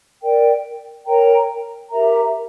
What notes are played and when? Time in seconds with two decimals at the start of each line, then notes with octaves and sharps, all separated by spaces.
0.22 A#4 D5 G5
1.06 A#4 C#5 G5 A#5
1.91 G4 A#4 E5 A#5